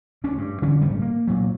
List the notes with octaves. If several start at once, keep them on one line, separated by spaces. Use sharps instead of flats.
D2 C#4 D4
G2
D3 E3 G3 C#4
D#1 G#1 C#3 G3
A#3
A#2 F#3